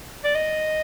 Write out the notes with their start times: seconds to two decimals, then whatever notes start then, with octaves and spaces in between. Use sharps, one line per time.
0.24 D5
0.35 D#5